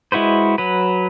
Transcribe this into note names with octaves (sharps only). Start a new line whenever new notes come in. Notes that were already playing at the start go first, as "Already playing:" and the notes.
G#3 E4 F#4 B4 C5
F#3 B4